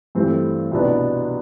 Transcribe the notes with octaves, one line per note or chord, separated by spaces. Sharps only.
G2 E3 A3 C4 G4
C2 B2 B3 D4